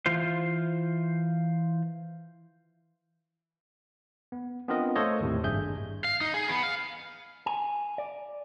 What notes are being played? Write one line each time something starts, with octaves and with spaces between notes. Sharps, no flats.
E3 F4 C5
B3
B3 C4 D4 F4 A#4 D#5
A3 A4 C5 C#5 D#5 F5
D#2 A2 C3
G#1 G2 G#4 E5 G6
F5
D#4
G#4
B3
F5
G#5
D5